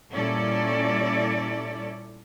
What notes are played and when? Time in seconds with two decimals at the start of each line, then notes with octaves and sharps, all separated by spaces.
0.12 A#2 G3 C#4 E4 A4 D5